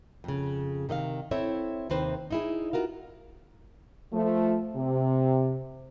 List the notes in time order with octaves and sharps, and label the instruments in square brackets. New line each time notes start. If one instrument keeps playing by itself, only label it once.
[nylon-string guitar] F2 C#3
C3 D#3 D#5 F5
C4 E4 A4 C#5 E5
D#2 C3 D#3 C4 B4 C5
D#4 E4 G#4
F4 F#4 A#4 F5
[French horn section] F3 A3
C3